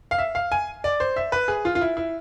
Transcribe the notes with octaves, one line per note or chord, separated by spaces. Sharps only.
F5
E5
F5
G#5
D5
C5
E5
B4
G#4
F4
F4
E4
E4